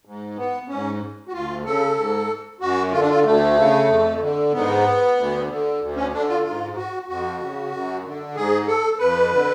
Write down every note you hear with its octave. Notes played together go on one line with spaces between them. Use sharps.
G#2
B3
G#2 C#4
F#4
D2 F4
C#3 A4
G#2
F#2 F#4
D3 F4
D4
F4
D2 A3
C#3
F2
D3
G#2 B3
D2
D3
D2
C#4
D3 D4
F4
G#2 F4
F#4
F2 F#4
C#3
F#2
D3
G#2 G#4
A4
F2 B4
D3